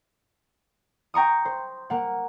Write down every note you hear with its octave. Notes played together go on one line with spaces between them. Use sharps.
G5 A#5 C#6 D#6
C5
A#3 F#5